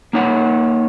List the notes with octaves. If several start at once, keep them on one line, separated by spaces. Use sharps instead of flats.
A#3 D#4 C#5 F#5